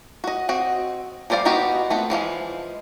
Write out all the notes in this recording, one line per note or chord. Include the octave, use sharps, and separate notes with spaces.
F#4 D#5
C4 F#4 D#5
F3 G3 C5 D5 F5
G#3 B3 D#4 F#4 G4
A3 B3 C4 F4
E3 F3 G#3 F5